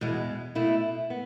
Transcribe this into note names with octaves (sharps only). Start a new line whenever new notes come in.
E2 B2 G#3
B2 A3 E4
B3